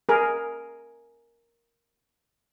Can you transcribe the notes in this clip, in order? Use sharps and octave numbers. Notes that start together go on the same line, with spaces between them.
G#4 A#4